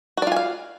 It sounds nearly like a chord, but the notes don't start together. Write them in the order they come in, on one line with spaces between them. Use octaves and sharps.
F#4 D5 F4 G#5 F5